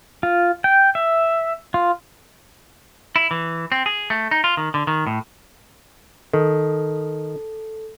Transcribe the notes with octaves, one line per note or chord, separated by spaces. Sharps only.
F4
G5
E5
F4
E4
E3
C4
G#4
A3
D#4
F4
D#3
D3
D#3
A2
D#3 A4